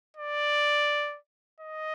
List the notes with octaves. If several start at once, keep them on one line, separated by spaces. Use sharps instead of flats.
D5
D#5